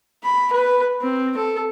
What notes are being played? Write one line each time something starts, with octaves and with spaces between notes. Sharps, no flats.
B5
B4
C4
A4